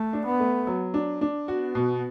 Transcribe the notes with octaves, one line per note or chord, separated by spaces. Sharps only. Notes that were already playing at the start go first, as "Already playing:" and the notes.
Already playing: A3
D4
B3
A3
F#3
D4
D4
B3 F#4
B2